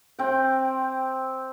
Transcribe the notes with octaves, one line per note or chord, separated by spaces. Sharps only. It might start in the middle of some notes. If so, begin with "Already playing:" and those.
C4 G5